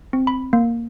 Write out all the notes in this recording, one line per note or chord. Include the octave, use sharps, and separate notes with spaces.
C4
B5
A#3